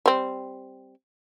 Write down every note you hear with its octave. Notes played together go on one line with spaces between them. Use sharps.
G3 C4